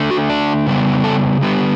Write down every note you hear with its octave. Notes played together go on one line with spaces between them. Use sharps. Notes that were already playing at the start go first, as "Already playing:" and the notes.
Already playing: D3 A3
F#4
D4
C#3 G3 B3
A4
D3 G3 B3